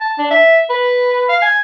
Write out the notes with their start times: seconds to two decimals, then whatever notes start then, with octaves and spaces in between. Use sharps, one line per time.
0.01 A5
0.18 D4
0.31 E5
0.70 B4
1.29 F5
1.42 G#5